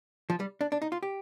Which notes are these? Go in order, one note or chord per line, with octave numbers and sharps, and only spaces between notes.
F3
G3
D4
D4
D#4
F4
G4